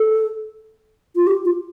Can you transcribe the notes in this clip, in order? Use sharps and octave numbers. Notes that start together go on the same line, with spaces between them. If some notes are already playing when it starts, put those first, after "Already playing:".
Already playing: A4
F4
G4
F4